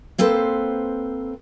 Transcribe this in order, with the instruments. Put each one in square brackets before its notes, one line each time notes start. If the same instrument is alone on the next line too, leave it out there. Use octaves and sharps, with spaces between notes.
[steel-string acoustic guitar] A#3 C4 A4 B4 C5